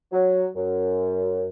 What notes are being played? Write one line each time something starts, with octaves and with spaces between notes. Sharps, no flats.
F#3
F#2